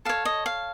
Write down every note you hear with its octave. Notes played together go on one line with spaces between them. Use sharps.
A4 C#5 F5
D#5
F5